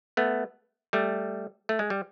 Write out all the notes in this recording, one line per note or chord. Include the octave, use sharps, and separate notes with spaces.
A3 B3
G3 A3
A3
G#3
G3